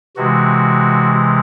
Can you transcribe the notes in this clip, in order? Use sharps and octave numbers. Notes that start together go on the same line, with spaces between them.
C3 E3 G#3 F#4